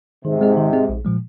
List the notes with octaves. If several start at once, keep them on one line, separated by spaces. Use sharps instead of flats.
G#2 C3 D#3
G#3 C4 G#4 D#5
D#3
G#3 C4 G#4 D#5
A#1
A#2 F3 G#3